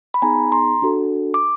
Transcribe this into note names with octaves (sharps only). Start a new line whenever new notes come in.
B5
B3 D#4 G#4 G#5 A#5
A#5 C6
D4 F#4 A4
D6